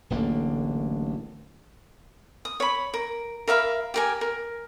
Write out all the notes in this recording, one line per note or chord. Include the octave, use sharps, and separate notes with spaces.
D1 A1 D3 A#3
D#6
C#5 B5
A#4
A#4 E5 F5 B5
G4 A#4 G#5
A#4